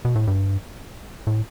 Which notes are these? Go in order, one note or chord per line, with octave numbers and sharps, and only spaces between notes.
B2
A2
G2
A2